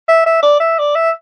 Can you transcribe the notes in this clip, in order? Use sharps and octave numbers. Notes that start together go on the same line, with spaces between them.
E5
E5
D5
E5
D5
E5